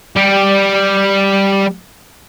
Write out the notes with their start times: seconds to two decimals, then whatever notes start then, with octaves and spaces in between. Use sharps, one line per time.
0.16 G3 G4